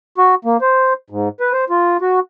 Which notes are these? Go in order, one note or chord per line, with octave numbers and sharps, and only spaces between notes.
F#4
A#3
C5
G#2
B4
C5
F4
F#4